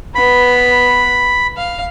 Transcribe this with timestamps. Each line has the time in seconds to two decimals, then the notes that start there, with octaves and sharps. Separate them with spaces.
0.15 B3 B5
1.57 F5